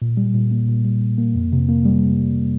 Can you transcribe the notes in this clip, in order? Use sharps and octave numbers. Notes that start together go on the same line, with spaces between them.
A#2
G3
A#2
A#3
A#2
G3
A#2
A#3
F2
C3
A#3
G3